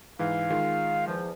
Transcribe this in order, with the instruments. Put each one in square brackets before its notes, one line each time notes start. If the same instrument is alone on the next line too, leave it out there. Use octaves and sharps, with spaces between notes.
[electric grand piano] G#2 E3 [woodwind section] F5
[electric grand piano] D#3 G#3 F4
[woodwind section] E2 F3